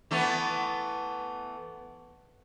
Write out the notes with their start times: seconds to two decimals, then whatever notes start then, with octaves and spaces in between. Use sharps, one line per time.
0.11 E3 A3 B3